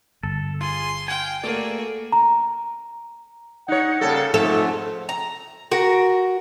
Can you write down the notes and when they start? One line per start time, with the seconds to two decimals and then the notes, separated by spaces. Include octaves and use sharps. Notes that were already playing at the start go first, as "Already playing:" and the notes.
0.23 G1 A4
0.61 F4 G#4 C6
1.08 F5 G5 G#5
1.44 A3 A#3 F#4 G#4 D5
2.12 A#5
3.68 D#4 C#5 F#5
4.01 C#3 G3 A#3 A4
4.34 F2 G#2 A3 A4
5.09 A#5
5.71 F#4 A#4